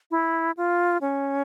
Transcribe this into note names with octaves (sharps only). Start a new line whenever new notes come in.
E4
F4
C#4